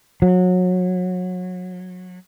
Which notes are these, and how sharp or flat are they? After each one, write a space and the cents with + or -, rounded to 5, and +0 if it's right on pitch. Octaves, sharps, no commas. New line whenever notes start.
F#3 -25